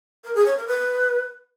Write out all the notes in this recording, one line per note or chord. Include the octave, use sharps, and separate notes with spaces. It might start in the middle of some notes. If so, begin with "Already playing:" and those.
A#4
G#4
C#5
A#4
B4